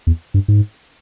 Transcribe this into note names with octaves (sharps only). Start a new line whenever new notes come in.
E2
G2
G#2